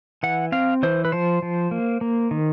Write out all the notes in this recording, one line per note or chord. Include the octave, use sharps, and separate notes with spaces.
E3 F#5
C4 F5
E3 C5
B4
F3 C5
F3
A#3
A#3
D#3